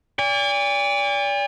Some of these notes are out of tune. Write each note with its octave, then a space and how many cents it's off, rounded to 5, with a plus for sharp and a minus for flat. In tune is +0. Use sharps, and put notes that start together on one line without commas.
D5 -35 G#5 -45